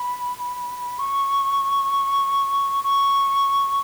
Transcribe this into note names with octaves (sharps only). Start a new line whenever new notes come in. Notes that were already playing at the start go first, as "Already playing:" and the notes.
Already playing: B5
C#6
C#6